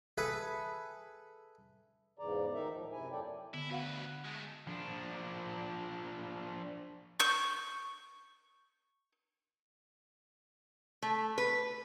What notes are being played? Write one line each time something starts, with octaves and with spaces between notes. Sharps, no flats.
G#4 A4 B4 E5
E2 G#2 C#3 E3 D5 A#5
D2 D#3 D#4 A#4 E5
A2 F3
F#2 C3 E4 G#5
E2 F#3 A4 D5 G5
D3 B3 E4
D2 F#4 B4 F5 F#5
G#3 A3
F3 D4
C#6 G6
A3
B4